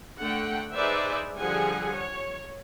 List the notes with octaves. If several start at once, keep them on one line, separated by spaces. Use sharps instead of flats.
D3 A3 F#5 G5
D#4 G#4 B4 C5 D5 E5
D3 F3 G3 G#4 F#5 G#5
C#5